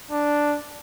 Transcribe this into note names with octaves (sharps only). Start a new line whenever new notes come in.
D4